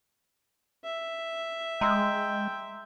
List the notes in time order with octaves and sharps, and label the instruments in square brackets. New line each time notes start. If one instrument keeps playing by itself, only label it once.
[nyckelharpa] E5
[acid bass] G#3 [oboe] G5 [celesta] A#5 C6 E6